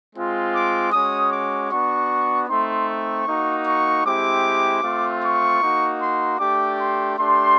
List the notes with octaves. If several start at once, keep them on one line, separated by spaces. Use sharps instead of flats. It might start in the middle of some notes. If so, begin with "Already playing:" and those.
G#3 C4 F4
D6
G#3 C#4 F#4 D#6
D6
B3 D4 F#4 C#6
A3 C4 D#4 C6
C#6
A#3 D#4 F#4
C#6
G#3 C4 E4 G4 D6
A3 C4 F4
C#6
A#3 D#4 F#4
C6
A3 D4 G4 D6
C6
A3 D4 G4 C6